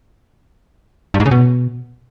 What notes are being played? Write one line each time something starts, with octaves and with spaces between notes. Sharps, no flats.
G2
G#2
C#3
B2